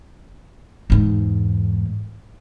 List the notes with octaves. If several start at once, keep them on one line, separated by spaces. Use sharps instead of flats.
E2 G#2